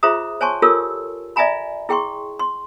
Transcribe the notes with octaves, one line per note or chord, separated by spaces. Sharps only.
F4 G#4 C5 E5 A#5 D#6
C5 C#5 G#5 A5 C6 C#6
F4 G4 A4 A#4 C#5 E6
D5 E5 F5 G#5 A#5 B5
E4 G#4 G5 C6 C#6
C6